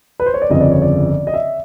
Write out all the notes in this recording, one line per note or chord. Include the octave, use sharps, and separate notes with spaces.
B4
C5
C#5
D5
G1 F2 C#3 F3 D#5
D5
C#5
D5
D#5
E5